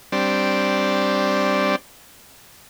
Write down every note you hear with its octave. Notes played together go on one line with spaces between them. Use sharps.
G3 C4 D4